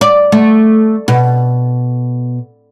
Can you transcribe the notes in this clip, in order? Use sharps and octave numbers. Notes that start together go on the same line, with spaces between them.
D5
A3
B2